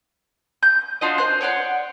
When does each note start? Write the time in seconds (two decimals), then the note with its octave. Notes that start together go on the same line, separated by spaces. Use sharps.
0.63 G6
1.01 D4 F4 F#4 D#5
1.18 C5 F#6
1.41 C#5 D5 F#5 C6